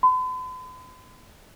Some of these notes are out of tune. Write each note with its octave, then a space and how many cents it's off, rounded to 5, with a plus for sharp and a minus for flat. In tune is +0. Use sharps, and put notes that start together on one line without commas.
B5 +45